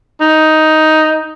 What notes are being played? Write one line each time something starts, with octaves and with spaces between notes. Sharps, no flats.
D#4